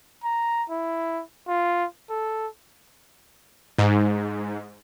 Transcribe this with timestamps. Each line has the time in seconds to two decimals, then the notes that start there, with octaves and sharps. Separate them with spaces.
0.24 A#5
0.70 E4
1.48 F4
2.10 A4
3.79 G#2